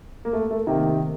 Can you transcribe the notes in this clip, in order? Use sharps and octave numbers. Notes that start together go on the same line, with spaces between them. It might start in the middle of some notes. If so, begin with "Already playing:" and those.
A#3
A3
A3
C3 D#3 A#3